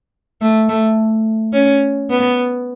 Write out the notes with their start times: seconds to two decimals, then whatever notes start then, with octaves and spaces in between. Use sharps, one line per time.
0.41 A3
0.69 A3
1.53 C#4
2.10 B3